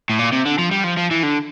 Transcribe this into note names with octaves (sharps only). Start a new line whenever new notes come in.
A2
A#2
C3
D3
F3
G3
F3
F3
E3
D3